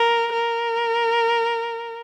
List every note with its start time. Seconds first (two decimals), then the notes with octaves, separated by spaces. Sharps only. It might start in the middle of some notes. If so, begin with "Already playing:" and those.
Already playing: A#4
0.33 A#4